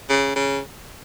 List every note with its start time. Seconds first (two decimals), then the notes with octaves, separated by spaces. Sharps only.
0.09 C#3
0.35 C#3